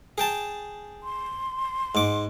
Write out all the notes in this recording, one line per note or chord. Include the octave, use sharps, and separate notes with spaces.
G#4 G5 A5
C6
G#2 D6